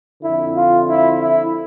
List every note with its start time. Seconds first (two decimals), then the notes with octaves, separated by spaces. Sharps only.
0.21 F2 D3 E4
0.53 F4
0.85 E4
1.18 E4